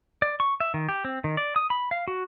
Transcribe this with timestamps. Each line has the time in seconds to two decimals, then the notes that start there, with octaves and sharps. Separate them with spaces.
0.22 D5
0.40 C#6
0.60 E5
0.74 D#3
0.89 G4
1.05 C4
1.24 D#3
1.37 D5
1.56 D#6
1.70 B5
1.91 F5
2.08 F#4